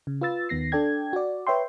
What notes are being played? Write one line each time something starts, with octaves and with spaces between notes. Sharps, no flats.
C#3
F4 B4 E6 A6
D#2 D#3 B3 A#6 C7
D4 A4 D5 G5 G#6
F#4 D5
B4 C#5 E5 G5 C6